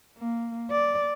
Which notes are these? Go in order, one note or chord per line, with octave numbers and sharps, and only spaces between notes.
A#3
D5